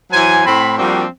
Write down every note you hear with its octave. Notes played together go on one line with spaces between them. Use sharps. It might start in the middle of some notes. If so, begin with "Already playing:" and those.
E3 F#3 C5 G#5
A2 C4 B5
F3 G3 A#3 C4 D4 F#4